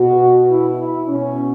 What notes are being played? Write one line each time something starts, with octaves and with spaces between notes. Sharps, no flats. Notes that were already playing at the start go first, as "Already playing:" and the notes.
Already playing: B2 F#4
E4
E4
B2 C#4